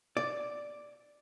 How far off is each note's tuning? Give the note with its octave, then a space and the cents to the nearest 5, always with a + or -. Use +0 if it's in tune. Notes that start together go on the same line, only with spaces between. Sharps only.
D5 +0